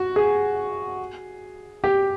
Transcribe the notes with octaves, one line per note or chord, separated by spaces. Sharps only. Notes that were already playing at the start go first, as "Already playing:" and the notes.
Already playing: F#4
G#4
G4